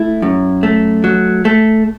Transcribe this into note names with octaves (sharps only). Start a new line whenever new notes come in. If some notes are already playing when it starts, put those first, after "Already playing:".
Already playing: A3 E4
F#2
A3
F#3
A3